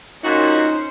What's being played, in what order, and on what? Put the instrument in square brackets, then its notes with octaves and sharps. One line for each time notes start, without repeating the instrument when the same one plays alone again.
[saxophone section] A#2 F#4 [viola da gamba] C#4 C5 [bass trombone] D#4